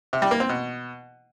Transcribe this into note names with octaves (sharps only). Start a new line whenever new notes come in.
C3
G3
A#3
C4
B2